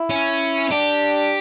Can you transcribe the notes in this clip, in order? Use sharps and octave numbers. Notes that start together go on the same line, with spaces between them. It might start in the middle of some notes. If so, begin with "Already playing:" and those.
Already playing: E4
C#4
D4 G4